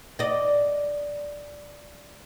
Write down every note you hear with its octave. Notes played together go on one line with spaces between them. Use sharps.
D5 D#5